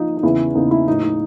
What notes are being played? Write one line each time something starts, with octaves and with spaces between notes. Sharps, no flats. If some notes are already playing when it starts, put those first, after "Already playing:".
Already playing: F3 D#4
D#4
E2 C#3 E3 E4
E2 C#3 E3 D#4
E4
A2 F3 D#4
D#4